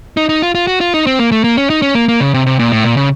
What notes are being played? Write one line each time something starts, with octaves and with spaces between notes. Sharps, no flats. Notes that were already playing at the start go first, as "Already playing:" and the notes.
D#4
D#4
F4
F4
F#4
F4
D#4
C4
A#3
A3
A#3
C#4
D#4
C#4
A#3
A#3
C#3
C3
C3
A#2
A2
A#2
C#3